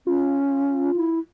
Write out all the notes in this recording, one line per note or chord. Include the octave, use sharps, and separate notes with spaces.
C#4 F4
E4